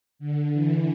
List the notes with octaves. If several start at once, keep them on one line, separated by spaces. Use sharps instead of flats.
D3
E3